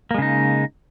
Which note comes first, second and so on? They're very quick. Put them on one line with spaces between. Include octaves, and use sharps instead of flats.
A#3 G#3 C#3 D#4